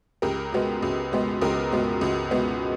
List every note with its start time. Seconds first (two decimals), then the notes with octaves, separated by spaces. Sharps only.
0.22 C#2 G4 A#4
0.52 B2 G#3 B3
0.82 C#2
1.12 B2 G#3 B3
1.41 C#2 G4 A#4
1.72 B2 G#3 B3
2.01 C#2
2.31 B2 G#3 B3